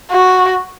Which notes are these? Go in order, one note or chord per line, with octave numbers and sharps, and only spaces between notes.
F#4